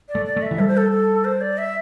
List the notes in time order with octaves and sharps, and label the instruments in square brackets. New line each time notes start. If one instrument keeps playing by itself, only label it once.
[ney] D5
[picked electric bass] A3
[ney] D5
[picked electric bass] A3
[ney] E5
[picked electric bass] E3
[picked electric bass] G3 [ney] A4
[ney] C5
A4
A4
C5
D5
E5